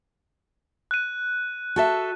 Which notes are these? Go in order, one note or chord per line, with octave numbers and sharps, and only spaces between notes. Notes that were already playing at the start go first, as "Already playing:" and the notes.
F#6 D#7
F#4 A4 E5